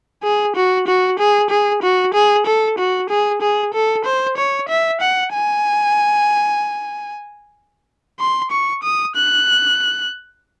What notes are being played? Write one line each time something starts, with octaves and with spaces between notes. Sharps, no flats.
G#4
F#4
F#4
G#4
G#4
F#4
G#4
A4
F#4
G#4
G#4
A4
C5
C#5
E5
F#5
G#5
C6
C#6
D#6
F#6